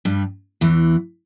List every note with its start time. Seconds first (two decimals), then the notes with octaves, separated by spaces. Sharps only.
0.05 G2 G3
0.61 E2 E3